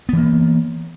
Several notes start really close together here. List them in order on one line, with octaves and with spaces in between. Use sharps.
B3 E3 A#3